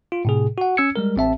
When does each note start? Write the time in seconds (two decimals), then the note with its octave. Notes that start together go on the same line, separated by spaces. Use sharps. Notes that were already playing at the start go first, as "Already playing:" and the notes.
0.12 F4
0.25 A2 C3 G#4
0.58 F#4 F#5
0.77 C#4 E6 G#6 C#7
0.96 G3 G#3 A#4
1.16 A1 C4 E5 A5